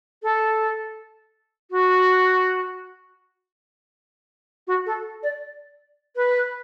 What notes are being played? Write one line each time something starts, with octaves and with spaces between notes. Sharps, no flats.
A4
F#4
F#4
A4
D5
B4